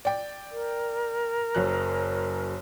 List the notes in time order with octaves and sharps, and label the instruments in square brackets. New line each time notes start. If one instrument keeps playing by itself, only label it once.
[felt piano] D5 G5
[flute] A#4
[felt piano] F#1 F#2 F#6